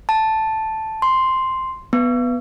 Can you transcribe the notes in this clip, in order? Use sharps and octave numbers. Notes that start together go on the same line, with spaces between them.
A5
C6
B3